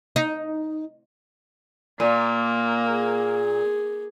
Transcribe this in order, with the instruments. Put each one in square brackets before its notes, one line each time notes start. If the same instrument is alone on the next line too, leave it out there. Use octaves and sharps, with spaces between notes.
[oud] D#4
[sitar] A#2 [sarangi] A#3
[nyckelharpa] G#4